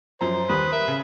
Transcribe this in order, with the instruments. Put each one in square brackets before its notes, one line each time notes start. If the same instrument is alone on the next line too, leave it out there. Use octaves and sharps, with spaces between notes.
[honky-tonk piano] F#2 F3 A#5 [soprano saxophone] C5
[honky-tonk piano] D#2 G3 D#6 [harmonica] B4
[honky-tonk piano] A#4 [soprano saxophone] E5
[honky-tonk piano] C#3